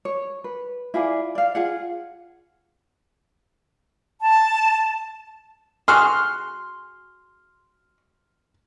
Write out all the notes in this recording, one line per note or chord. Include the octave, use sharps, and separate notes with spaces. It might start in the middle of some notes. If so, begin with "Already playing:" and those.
C#5
B4
E4 F4 G#4 D5
D5 F5
F4 G#4 F#5
A5
F#4 G#4 C6 F6